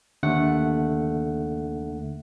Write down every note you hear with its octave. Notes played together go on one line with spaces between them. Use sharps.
D#2 D3 A3 F#5